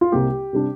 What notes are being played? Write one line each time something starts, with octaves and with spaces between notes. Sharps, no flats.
F4
C2 C3 G3 A#3 G4
C3 G3 D4